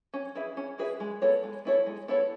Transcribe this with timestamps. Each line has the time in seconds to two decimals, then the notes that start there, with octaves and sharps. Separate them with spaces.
0.14 C#4
0.35 E4 G#4 B4 E5
0.57 C#4
0.78 E4 G#4 B4 E5
1.00 G#3
1.22 B3 E4 A4 C#5
1.43 G#3
1.65 B3 E4 A4 C#5
1.86 G#3
2.08 B3 E4 A4 C#5